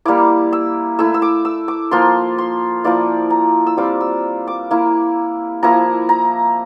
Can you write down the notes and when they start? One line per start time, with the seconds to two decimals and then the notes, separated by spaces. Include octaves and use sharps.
0.05 G3 A#3 E4 D6
0.53 E6
0.99 A3 E4 E6
1.14 E6
1.22 D6
1.45 E6
1.68 D6
1.91 F3 A#3 F4 C6
2.38 C6
2.84 F3 A#3 E4 D5
3.30 A#5
3.67 E6
3.77 G3 C4 F4 D6
4.01 E6
4.47 D6
4.71 A#3 E4
5.63 F3 A#3 E4 A#5
6.09 A#5